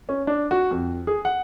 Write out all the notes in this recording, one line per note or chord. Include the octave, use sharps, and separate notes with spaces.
C#4
D4
F#4
F2
G#4
F#5